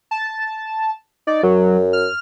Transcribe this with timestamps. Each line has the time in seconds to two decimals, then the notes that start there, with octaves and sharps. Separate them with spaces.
0.11 A5
1.27 D#4 D5
1.43 F#2 F#3
1.93 F6